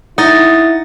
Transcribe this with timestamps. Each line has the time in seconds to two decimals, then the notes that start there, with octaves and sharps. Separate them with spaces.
0.18 D#4 E4 F#5 D#6 A6